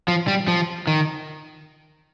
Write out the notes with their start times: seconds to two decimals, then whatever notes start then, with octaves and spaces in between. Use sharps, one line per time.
0.08 F3
0.28 G3
0.48 F3
0.87 D#3